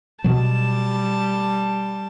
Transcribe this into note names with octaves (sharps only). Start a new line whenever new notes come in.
B2 F#3 G3 A5